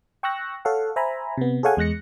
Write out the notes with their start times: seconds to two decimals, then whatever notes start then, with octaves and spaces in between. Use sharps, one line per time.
0.23 G5 C#6 E6 F#6 A#6
0.65 A4 C#5 F5 F#5
0.96 C5 E5 G#5 A#5 B5
1.38 C3 B3
1.63 G#4 A4 C#5 F5 F#5 G#5
1.77 E2 G#3 F#6 A#6 C#7